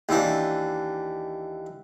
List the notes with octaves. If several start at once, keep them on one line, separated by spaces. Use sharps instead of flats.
D#2 E3 D4